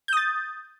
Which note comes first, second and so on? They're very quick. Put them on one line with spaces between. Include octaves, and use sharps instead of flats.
G6 D#6 A6